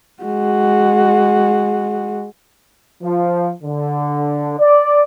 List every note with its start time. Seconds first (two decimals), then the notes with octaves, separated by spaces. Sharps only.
0.23 G#3 F#4
3.03 F3
3.63 D3
4.60 D5